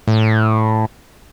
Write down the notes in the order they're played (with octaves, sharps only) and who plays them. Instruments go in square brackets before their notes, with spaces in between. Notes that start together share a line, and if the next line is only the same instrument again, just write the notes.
[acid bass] A2